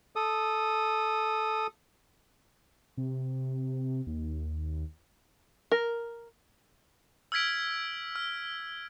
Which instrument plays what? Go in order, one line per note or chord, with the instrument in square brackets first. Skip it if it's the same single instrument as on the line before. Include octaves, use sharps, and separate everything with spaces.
[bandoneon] A4 D#6
[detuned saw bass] C3
D#2
[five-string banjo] A#4
[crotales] E6 F6 G#6 B6 D7
F6